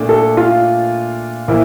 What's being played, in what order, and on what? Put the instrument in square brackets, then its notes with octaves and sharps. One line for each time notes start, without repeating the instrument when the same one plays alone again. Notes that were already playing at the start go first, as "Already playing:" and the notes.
Already playing: [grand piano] A#2 A3 D4
[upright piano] A4
F4
[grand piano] A#2 F3 A#3 [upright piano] E4